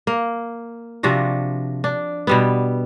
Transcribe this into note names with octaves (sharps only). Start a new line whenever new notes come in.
A#3
C3 F3 D4 F#4
D4
B2 G3 B3